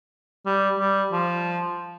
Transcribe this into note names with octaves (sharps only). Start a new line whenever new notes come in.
G3
G3
F3